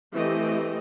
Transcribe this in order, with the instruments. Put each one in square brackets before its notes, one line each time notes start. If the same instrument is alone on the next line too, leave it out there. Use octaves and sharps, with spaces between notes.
[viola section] E3 A3 C4 G4 D#5